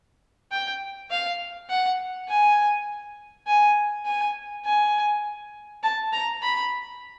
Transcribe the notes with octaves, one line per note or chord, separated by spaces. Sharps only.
G5
F5
F#5
G#5
G#5
G#5
G#5
A5
A#5
B5